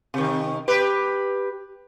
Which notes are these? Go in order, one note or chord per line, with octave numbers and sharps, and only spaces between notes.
C3 D#3
G4 B4